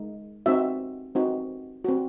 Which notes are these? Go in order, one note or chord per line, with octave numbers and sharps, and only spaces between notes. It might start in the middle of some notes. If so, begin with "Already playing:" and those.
Already playing: G#3 D#4
C4 D#4 F#4 E5
C4 D#4 F#4
C4 F#4